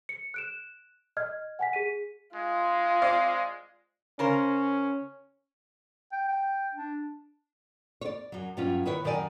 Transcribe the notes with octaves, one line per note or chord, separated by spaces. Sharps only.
C#7
F#6 D7 E7
D#5 F6 G#6
F#5 G#5 B6
G#4 B6 D#7
G#3 F4
C4 D5 F5
C#3 C#4 A#4 C5
G5
G5
D4
C#5 D5
F#2 F#3
G2 F#3 C#4 F4
D#3 E4 B4 C#5
F#2 D#3 F#4 A#4 D5 G#5